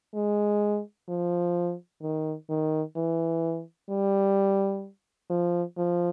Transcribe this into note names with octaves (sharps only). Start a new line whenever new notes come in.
G#3
F3
D#3
D#3
E3
G3
F3
F3